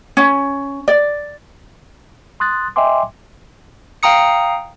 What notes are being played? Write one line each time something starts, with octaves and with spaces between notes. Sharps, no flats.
C#4
D5
C6 D#6 F#6 A6
D#5 E5 G5 G#5 C6 D6
F5 G5 A#5 D#6 C#7